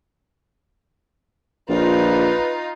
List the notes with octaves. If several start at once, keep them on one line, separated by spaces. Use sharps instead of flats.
A#1 D#4 F4 B4